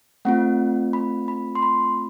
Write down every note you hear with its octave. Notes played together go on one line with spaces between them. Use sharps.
A3 C4 F4 F#5
B5
B5
C6
B5